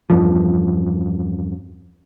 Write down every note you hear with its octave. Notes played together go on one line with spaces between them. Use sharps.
E2 G2 F3